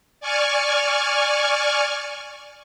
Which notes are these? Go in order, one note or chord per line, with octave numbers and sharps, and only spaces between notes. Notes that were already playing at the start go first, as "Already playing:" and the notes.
D5 G#5 C#6 F6